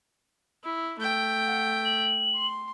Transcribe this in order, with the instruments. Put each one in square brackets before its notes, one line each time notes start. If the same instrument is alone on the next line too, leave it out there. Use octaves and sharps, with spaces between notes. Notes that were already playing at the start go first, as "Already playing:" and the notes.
[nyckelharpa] E4
A3 G5
[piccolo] F#5
F#7
[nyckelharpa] C6